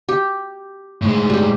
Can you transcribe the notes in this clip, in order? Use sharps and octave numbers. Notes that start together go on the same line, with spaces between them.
G4
A2 G#3
G3 G4